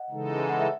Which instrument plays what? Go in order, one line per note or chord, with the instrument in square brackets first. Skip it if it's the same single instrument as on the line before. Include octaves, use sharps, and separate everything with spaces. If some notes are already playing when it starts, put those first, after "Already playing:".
Already playing: [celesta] D#5 F#5
[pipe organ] C#3 E3 G#3 D#4 A4
[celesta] G#5
F#5
E5